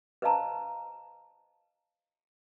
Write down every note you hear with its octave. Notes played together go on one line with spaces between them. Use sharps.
B4 C5 D#5 F5 A5 A#5